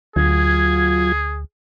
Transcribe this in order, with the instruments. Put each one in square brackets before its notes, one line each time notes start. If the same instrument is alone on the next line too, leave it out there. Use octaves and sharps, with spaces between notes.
[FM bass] D2 [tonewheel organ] F#3 F4 G#6 [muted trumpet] G#4